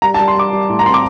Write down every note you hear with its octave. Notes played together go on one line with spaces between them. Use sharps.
G3 A#5
A5
G3
C6
G3 D6
G3
A2
A#5
C4 C6
D6